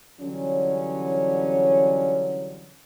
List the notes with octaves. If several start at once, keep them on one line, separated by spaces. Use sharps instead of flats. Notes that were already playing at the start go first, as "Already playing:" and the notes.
D3 E3 F#3 G3 C#4